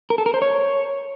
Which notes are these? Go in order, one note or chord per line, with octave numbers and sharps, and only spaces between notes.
A#4
A4
A#4
C5
C#5